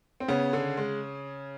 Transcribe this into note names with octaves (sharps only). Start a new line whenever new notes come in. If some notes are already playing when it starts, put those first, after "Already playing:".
C4
C#3 B3 C#4
D3
G#3